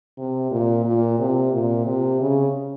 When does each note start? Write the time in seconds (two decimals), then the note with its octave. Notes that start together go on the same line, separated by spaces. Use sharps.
0.18 C3
0.51 A#2
0.85 A#2
1.19 C3
1.53 A#2
1.86 C3
2.21 C#3